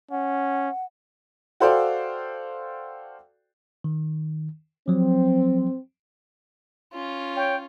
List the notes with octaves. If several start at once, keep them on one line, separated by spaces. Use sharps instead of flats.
C#4 F#5
F#4 A4 C5 D5 F5 G5
D#3
F3 F#3 C4
C#4 F4
C#5 G5